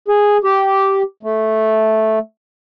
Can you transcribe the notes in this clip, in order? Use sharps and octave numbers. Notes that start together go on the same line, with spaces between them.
G#4
G4
A3